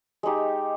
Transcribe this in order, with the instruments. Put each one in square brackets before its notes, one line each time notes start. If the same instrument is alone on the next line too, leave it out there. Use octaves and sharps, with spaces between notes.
[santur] G#3 D#4 G4